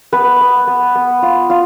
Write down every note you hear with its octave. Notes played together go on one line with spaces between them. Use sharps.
B3 B4
B3
B3
B3
F4
F4